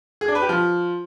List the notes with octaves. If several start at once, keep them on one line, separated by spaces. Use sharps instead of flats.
G#4
D4
B4
G4
F3